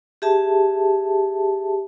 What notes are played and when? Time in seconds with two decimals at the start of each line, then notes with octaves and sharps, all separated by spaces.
0.22 G4 G#4 E5 A5